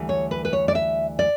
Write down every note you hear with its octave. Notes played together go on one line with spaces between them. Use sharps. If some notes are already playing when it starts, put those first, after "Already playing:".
Already playing: D2 E3 G3
C#5
B4
B4
C#5
D5
E5
D5